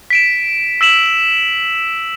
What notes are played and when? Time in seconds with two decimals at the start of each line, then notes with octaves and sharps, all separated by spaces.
0.10 B6 D7 E7
0.81 E6 B6 E7 F#7